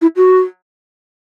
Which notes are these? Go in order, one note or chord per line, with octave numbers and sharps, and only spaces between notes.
E4
F#4